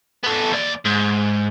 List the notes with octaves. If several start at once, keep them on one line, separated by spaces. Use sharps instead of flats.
B3 A4
D#2 D5
G#2